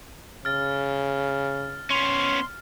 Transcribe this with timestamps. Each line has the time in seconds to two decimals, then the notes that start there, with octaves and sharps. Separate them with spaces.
0.45 C#3 F6 A6
1.90 B3 C#4 C6